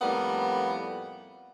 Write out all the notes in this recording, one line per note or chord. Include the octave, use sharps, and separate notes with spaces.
F2 A2 G3 A#3 B3